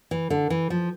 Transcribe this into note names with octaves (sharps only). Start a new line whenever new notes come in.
E3
D3
E3
F3